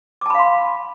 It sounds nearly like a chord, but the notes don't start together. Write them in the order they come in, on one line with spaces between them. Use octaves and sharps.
D6 A5 B5 F5 C6